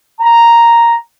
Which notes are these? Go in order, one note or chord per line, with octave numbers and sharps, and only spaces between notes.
A#5